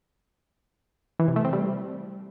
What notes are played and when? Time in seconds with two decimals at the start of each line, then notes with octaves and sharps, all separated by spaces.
1.19 E3
1.28 C3
1.36 A3
1.45 C4
1.53 G3